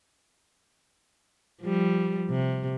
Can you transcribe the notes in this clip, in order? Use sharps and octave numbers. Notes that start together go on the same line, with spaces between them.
F3 G3
C3